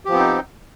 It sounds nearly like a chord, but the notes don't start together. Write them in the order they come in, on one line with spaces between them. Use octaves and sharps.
G4 F3 B3 C4 D#4